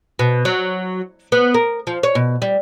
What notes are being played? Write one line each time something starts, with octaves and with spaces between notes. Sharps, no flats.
B2
F#3
B3
A#4
F3
C#5
B2
G3